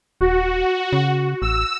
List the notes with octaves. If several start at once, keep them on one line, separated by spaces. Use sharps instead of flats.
D#1 F#4
C#3
A1 E6